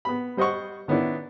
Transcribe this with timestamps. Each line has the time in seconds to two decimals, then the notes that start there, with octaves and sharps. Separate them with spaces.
0.05 B3 B5
0.37 G3 C5 D#5 F#5 C#6
0.88 D#3 B3 C#4 D4 E4